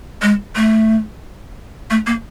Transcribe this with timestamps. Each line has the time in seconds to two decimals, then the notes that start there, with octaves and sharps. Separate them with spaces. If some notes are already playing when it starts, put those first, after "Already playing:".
0.22 G#3
0.56 A3
1.90 A3
2.06 A#3